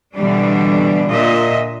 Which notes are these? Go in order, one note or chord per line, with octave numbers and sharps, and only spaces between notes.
B2 D3 E3 G3 D4
A#2 D4 D#5 E5